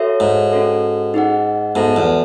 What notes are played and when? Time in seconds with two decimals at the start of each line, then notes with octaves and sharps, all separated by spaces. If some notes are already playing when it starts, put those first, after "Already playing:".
Already playing: F#4 A4 C#5 E5
0.20 G#2
0.51 C#4 F#4 A4
1.14 D#4 G#4 D#5 F#5
1.75 G#2 B3 F#4 A4 E5 A5
1.96 E2